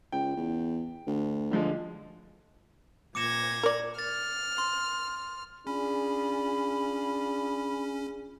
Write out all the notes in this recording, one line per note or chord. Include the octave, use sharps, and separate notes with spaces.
C#2 G5
E2
D2
D3 F3 G#3
A#2 D6 G#6 A#6 C#7 E7
A#4 D5
F6 A6
C6
C#4 D4 F4 G#4 B5